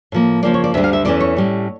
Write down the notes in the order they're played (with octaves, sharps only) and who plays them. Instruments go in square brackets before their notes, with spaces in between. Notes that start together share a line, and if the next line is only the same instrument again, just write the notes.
[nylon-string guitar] A2 F3 A#3
C#3 F3 A#3 D5
C#5
D5
D2 D3 G3 E5
F5
E5
E2 E3 A3 C#4 D5
C#5
A2 G3 C#4